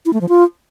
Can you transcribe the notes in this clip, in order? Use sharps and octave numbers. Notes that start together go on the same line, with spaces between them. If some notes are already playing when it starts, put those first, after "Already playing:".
E4
A3
F3
F4